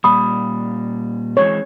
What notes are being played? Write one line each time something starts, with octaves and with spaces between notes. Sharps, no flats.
A#2 G3 B5 D#6
E3 G#3 C4 C#5